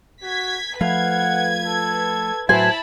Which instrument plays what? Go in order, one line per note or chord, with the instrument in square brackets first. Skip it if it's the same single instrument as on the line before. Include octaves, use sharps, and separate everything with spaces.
[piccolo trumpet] F#4 [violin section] G#6 B6
[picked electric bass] F3 A3 [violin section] B4 G#6 [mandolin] F5 B5 [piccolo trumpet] F#5
[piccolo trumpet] A4
[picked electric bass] A2 F#3 [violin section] E4 A5 B5 [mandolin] B4 C5 G#5